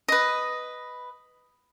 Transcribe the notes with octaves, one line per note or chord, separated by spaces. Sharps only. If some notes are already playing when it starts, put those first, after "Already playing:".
B4 D#5